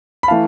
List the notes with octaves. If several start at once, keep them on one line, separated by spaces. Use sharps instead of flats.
B5
E3 A3 F5 A5